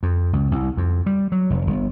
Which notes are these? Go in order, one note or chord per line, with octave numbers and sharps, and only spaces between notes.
F2
C#2
C2
F2
G3
F#3
F1
G1